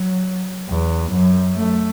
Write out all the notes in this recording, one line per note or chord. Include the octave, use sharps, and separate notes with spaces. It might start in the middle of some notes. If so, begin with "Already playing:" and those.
Already playing: F#3
E2
F#2
A3